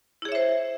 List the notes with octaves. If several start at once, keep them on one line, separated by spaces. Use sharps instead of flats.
E4 G#4 C5 C#5 E5